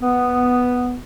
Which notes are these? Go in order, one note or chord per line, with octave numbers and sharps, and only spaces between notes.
B3